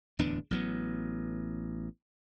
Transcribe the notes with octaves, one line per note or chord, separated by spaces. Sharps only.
D1 E2 B3 D4
A1 F#3 B3